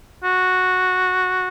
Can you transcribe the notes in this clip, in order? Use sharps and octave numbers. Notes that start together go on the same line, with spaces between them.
F#4